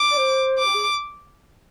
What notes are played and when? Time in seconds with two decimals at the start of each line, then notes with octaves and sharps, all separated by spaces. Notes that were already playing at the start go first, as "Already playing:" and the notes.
Already playing: D6
0.10 D5
0.17 C5
0.59 D6
0.65 G4
0.74 G#4